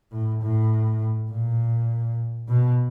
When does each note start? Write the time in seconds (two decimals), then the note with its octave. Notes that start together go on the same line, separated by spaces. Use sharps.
0.12 A2
0.42 A2
1.31 A#2
2.49 B2